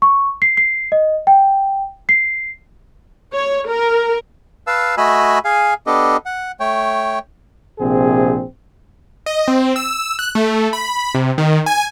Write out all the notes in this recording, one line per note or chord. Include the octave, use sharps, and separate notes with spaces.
C#6
C7
C7
D#5
G5
C7
C#5
A#4
B4 F5 A5 E6
A3 F#4 D#5 G#5 B5 E6
G#4 F5 G#5
B3 D4 G4 A4 D#5
F#5
A3 C#5 G5
A#1 C3 C4 G#4
D#5
C4
E6
F#6
A3
B5
C3
D#3
G#5